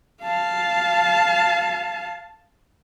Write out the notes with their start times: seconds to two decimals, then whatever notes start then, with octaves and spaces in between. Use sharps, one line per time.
0.23 F5 A5